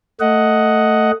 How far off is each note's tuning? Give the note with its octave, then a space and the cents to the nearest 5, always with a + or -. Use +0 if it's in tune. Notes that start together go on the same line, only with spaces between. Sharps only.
A3 +15 D#5 +10 F#5 +0